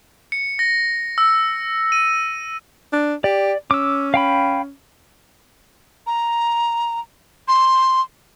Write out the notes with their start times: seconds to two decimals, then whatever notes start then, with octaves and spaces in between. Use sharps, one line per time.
0.32 C#7
0.59 A#6
1.18 E6
1.92 D#7
2.93 D4
3.24 G4 D5
3.71 C#4 D6 E6
4.14 F5 G5 B5
6.07 A#5
7.48 C6